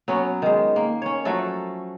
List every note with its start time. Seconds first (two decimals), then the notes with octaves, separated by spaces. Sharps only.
0.08 F#3 B3 C#4
0.42 D#3 G#3
0.76 A#3
1.02 C#4 C#5
1.25 F3 F#3 A3 A4